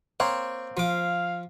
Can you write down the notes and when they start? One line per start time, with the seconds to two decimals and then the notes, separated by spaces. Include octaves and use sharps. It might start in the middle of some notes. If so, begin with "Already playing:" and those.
0.20 A#3 C4 C#5
0.77 F3 F5 D6